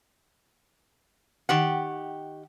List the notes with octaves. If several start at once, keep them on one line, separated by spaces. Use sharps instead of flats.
D#3 G4 F#5